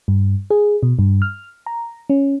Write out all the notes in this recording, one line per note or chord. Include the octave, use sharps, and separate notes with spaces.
G2
G#4
B2
G2
F6
A#5
C#4